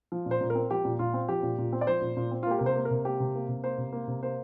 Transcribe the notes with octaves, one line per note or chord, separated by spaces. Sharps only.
F3
A#2
C5
A#2
A#4
C4
F3 G4
A#2
A#2 F4
C4
F3 G4
A#2
A#2
C4
D5
F3 C5
A#2
A#2
C4
F4
A#3 G4
C3 A#4
C5
A#3
A#4
C3
A#3 G4
C3
A#3
C3
A#3 C5
C3
A#3
C3
A#3 C5